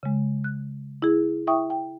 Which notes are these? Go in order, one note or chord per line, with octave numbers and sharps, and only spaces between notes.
C#3 G#3
F#6
E4 G#4
E4 E5 G5 C#6 D#6
G5